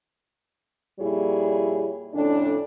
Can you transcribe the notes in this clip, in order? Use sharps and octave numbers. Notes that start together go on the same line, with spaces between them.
F2 A#2 G3 E4 G#4 C#5
F2 A2 D3 C#4 D4